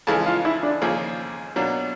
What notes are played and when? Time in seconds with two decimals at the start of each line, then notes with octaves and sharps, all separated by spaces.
0.07 F2 C#3 E3 G#3 F4
0.26 F4
0.45 E4
0.63 D4
0.81 D#2 C#3 F3 A#3
1.56 B2 F#3 A#3 D4